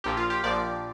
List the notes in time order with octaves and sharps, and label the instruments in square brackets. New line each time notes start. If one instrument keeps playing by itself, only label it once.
[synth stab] A#1 A#2 F3 G4
F4
G4
A#1 A#2 F3 D5